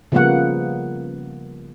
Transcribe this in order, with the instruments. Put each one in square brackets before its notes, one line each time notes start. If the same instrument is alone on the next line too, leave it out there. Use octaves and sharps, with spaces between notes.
[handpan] C#3 F3 G3 A#3 B3 F#5